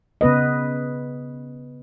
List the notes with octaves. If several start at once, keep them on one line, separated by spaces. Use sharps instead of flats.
C#3 B3 B4 D#5